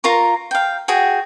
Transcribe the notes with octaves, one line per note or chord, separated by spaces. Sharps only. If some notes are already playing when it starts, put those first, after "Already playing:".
F4 A#4 A#5 C#6
F5 G5
F#4 G#4 G5